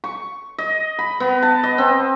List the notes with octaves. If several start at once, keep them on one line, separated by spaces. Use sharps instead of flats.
C#6
D#5
B5
B3
A5
D#5
C4